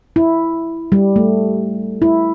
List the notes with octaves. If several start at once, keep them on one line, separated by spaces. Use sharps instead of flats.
E4
G3
A3
E4